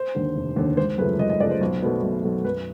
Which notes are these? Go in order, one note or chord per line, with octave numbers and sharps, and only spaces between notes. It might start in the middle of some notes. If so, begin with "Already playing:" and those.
Already playing: C5
D#2 D3
F1
D#2 D3
G#1 C5
F#2 C#3 F3 A3 B4
G#1 D#5
D#5
F#2 C#3 F3 A3 D5
C5
B1
B2 F#3 A3
B1
B2 F#3 A3
F#2 B4